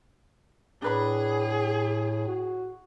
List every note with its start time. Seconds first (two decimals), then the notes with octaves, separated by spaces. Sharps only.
0.82 A2 D4 G#4 B4 B5
2.28 F#4